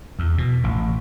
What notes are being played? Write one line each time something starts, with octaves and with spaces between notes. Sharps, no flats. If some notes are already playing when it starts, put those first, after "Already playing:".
E2
B2
A1